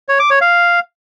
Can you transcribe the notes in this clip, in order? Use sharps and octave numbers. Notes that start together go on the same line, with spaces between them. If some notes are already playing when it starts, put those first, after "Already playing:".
C#5
D6
C#5
F5